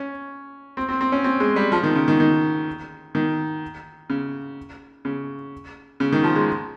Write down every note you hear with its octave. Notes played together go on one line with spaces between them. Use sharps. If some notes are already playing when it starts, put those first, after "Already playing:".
Already playing: C#4
C4
C4
C4
C#4
C4
G#3
G3
F3
D#3
C#3
D#3
D#3
D#3
C#3
C#3
C#3
D#3
F3
G#3